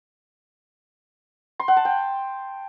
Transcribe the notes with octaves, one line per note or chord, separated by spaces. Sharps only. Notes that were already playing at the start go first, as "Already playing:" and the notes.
C6
F#5
A5
G5